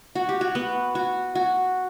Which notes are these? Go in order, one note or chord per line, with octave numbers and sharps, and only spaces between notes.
F#4
G4
F#4
B3
F#4
F#4